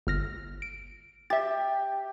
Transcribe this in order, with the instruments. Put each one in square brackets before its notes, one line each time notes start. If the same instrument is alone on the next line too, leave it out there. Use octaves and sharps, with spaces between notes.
[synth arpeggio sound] G1 F6 A#6
D7
[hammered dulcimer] G4 [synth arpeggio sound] E5 A6